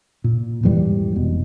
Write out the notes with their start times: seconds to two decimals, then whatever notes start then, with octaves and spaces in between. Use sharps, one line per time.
0.24 A#2
0.63 E2 G#2 E3 G3
1.16 F1 B2